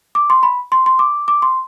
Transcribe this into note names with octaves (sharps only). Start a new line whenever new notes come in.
D6
C6
B5
C6
C6
D6
D6
C6